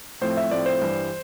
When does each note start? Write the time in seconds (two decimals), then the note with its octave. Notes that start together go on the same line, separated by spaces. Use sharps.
0.21 A2 F3 A3 C4 C5
0.37 E5
0.51 A2 F3 A3 C4 D5
0.66 C5
0.81 G2 E3 G3